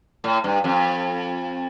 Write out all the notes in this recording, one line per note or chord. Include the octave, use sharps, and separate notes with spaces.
A2
G2
F2